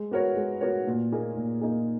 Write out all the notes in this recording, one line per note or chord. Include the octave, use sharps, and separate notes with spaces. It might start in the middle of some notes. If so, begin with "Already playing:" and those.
Already playing: G#3
B3 F#4 A#4 C#5
G#3
B3 F#4 A#4 C#5
A#2
A#3 D#4 G#4
A#2
A#3 D#4 G#4